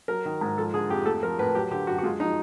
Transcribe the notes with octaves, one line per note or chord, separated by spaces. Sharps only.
F#3 A#4
D#3
G#2
F3 A4
D3 G#4
F2 G4
A3 A4
F3 A#4
A2 B4
F#3 G4
D3 G4
F#2 F#4
F#4
G#3 F4
F3 D#4